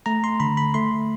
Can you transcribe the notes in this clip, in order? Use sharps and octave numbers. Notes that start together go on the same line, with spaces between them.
A3 A#5
C6
D3 B5
B5
A3 C6